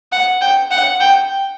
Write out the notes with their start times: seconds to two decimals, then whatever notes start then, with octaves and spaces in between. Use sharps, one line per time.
0.12 F#5
0.41 G5
0.71 F#5
1.00 G5